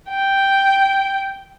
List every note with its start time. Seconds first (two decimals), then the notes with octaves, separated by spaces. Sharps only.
0.10 G5